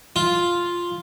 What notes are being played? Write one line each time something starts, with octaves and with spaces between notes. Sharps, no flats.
F4